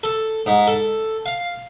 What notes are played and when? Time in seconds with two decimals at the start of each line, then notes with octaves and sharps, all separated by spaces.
0.03 A4
0.46 G#2
0.67 A4
1.26 F5